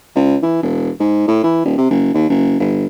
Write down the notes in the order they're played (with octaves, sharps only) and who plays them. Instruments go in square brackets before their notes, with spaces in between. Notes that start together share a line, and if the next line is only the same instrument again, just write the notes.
[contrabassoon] C#2
E3
E1
G#2
A2
E3
D#1
C3
F#1
D#2
F#1
G1